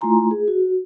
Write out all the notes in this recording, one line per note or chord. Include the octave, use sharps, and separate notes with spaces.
A3 E4 F4 G#5 A#5 C6
G#4
F#4